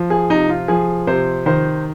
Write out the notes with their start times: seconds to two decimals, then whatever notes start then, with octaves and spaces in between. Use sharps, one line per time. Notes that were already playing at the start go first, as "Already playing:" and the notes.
Already playing: F3
0.10 G#4
0.30 C3 D#4
0.49 F4
0.68 F3 G#4
1.07 C3 C5
1.46 D#3 C5